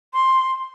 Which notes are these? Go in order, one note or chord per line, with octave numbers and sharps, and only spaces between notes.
C6